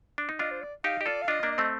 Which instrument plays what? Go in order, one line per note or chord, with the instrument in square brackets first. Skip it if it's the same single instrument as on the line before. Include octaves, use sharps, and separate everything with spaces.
[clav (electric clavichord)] D4
D#4
[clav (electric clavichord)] D4 F4 [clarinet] D#5
[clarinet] C5
D5
[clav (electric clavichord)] D#4 G4 [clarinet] F5
[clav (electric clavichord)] G4 [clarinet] D#5
[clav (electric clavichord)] F4 A4 [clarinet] D5
[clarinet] F5
[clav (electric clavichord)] D4 F4 [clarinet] D#5
[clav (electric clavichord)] A#3 D4
[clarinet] D#5
[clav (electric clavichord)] A3 C4